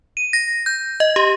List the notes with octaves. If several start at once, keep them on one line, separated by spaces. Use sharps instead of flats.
D#7
A#6
G6
D#5
G4